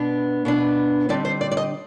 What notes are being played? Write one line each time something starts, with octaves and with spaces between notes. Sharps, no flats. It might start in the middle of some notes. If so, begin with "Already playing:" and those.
Already playing: B2 B3 D4
B2 B3 D4
D3 G3 C4 D#4 D5
C5
D5
D5
D#5